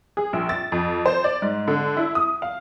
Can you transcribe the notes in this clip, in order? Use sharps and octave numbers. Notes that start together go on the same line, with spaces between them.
G#4
A#1
A6
F2
C5
D5
G#2
D3
E4
D#6
F5